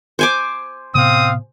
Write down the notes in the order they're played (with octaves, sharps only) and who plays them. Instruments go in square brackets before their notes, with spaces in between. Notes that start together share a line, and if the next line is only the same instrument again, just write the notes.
[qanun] C5 G#5 D6
[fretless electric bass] A2 C3 B3 [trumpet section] C4 F5 D#6